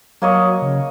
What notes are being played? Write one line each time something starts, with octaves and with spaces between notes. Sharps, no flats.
F#3 A#3 C#5 D#5
C#3